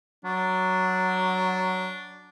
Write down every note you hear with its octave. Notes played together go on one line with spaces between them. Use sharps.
F#3 D4